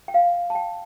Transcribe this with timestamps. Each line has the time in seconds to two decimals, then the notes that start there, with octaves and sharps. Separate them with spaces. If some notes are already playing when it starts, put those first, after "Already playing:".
0.08 G5
0.14 F5
0.50 A5
0.55 G5